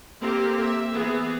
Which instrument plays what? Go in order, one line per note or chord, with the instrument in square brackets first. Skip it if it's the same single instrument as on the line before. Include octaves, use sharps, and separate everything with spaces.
[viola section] A#3 C4 G4 A4
E5
E3 B3 G#4